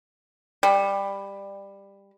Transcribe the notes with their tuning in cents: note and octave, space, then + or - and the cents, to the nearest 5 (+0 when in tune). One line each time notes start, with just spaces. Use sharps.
G3 +15